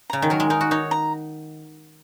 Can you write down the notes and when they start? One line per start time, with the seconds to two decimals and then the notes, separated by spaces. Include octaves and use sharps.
0.10 C#3 A#5
0.22 D#3
0.30 F#3 A#4
0.40 G#3
0.50 D#4 A#4
0.61 F#4
0.71 D#4 C#5
0.91 A#5